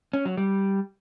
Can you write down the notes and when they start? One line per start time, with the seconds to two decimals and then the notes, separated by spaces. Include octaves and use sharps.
0.13 C#4
0.25 F#3
0.37 G3